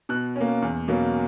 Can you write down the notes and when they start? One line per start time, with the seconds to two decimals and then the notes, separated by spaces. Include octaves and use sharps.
0.09 B2 F#6
0.36 C#4
0.41 A#3
0.62 E2
0.88 B2 F#3 A#3 C#4